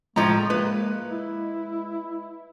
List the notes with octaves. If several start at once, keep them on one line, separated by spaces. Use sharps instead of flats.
A2 F3 G#3 A3 D#5 A#5
A#3 B4
E4